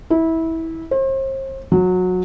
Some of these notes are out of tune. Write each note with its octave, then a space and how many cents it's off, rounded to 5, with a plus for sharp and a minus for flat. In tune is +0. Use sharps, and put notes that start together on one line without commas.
E4 -20
C5 +40
F#3 -20